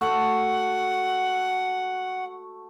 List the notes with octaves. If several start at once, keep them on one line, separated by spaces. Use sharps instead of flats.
A3 F#4 A4 F#5